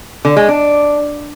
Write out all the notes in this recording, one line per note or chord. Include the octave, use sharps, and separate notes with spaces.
D3
G#3
D4